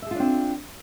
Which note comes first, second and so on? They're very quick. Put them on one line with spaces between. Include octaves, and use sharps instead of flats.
E5 G#4 F4 D4 C4